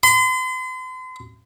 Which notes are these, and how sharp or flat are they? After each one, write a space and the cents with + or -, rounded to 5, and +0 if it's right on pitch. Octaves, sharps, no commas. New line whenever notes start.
C6 -40